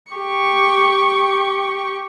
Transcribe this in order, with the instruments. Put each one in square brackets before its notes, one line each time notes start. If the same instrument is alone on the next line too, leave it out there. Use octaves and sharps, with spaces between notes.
[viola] G4 C#6